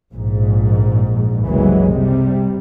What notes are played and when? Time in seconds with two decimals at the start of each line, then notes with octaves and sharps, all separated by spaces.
0.12 A#1 G#2
1.47 F#1 C2 E3 F#3 G#3
1.92 C3 G3